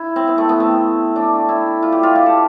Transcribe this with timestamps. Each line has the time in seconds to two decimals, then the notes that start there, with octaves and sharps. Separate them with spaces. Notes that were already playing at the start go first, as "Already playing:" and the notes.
Already playing: E4
0.16 C4
0.27 B3
0.38 A3
0.49 B3
0.60 C4
1.16 D4
1.49 E4
1.83 F4
1.92 G4
2.03 F4
2.15 G4
2.26 A4